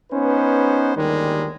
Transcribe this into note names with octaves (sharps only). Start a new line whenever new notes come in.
B3 C#4 D#4 B4 C5
G1 D#2 D#3 G3 G#3